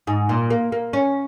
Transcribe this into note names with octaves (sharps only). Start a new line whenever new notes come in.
G#2
A#2
A#3
A#3
C#4